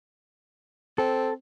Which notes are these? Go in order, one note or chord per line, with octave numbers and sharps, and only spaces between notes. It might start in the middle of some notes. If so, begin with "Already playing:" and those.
C4 A4